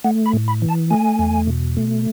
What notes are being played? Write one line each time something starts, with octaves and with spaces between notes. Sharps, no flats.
A3 F#5
B5
A2
B5
E3
A5
A3 G#5
E2
B2
A3